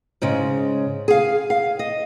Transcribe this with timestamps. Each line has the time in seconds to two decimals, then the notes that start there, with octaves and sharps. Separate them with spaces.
0.22 G#2 C#3 G#3
1.08 G#4 F5
1.50 F5
1.79 D#5